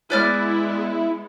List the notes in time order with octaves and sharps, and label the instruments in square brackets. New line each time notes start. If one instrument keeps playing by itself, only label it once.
[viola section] G#3 B3 [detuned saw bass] E4 [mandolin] B4 D5 F6